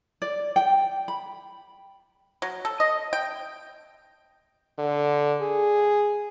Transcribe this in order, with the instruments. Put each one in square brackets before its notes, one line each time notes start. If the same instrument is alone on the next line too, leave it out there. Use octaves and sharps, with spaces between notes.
[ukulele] D5
G5
B5
[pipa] F#3
A4
D#5
G5
[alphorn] D3
G#4